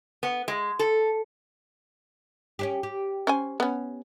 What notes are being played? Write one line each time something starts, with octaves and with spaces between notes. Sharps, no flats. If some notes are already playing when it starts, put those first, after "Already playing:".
B3
G#3
A4
C#4 D4 G4
G4
C#4 C5 G#5
B3 C#4